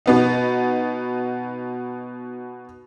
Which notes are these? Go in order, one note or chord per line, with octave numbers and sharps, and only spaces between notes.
B2 B3 D#4